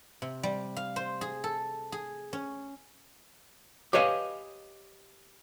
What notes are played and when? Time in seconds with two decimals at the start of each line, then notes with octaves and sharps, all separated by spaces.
0.22 C3
0.43 G3
0.77 F5
0.96 C5
1.21 G#4
1.44 A4
1.92 G#4
2.33 C#4
3.93 G4 B4 C#5 D#5 F5 G#5